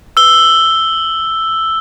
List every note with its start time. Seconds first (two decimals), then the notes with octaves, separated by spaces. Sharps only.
0.17 E6 G7